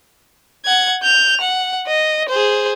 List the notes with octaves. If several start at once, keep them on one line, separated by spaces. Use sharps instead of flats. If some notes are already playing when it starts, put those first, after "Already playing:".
F#5 G#6
G6 F7
F#5
D#5
G#4 C5